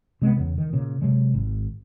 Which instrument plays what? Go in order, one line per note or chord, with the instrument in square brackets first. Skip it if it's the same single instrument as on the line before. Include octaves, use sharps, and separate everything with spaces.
[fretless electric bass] C3 G#3 A#3 B3
E2 C#3
D#3
A#2 C#3
C3 F#3 G#3
G#1